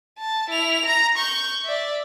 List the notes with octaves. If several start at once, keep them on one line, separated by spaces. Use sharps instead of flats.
A5
E4 F7
A#5
C#6 G6
D5 E5